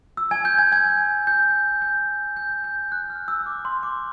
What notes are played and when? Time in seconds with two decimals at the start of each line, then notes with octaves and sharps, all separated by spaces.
0.17 E6
0.31 G#5 G#6
0.45 G6
0.58 G#5 G#6
0.72 G#5 G#6
1.27 G6
1.82 G6
2.37 G6
2.64 G6
2.92 F#6
3.10 F6
3.28 E6
3.46 D6
3.65 C6
3.83 D6